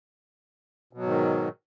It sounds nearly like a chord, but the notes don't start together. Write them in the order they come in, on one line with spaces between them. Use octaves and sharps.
B2 F#3 G#2 D#3